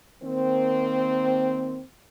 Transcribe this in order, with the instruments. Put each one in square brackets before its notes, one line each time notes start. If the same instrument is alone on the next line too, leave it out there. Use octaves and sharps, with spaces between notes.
[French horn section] D#3 A#3 C4